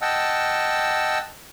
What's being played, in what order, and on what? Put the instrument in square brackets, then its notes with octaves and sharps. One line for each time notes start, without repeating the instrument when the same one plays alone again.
[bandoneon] D#5 F#5 G5 A5 E6